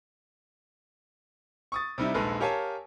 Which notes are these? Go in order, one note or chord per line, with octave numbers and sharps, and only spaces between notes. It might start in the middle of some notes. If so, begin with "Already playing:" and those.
C#6 D#6 A6
C3 G3 D#4 E4
A#1 D#2 G#3 A4 B4 F6
G4 A#4 C#5 F5 G#5 A5